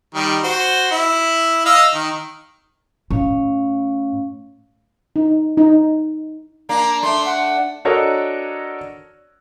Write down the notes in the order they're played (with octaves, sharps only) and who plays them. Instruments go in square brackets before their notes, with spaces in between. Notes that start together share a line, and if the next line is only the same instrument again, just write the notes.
[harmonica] D#3 G3
F#4 C5
E4
D#5 F5 E6
D#3
[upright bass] A2 [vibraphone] C#4 C#5 F5
[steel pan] D#4
D#4
[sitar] A#3 D4 [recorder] A#5
[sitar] A3 D4 [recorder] C6
[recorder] F#5
[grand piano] D4 F#4 A4 A#4 C#5 D#5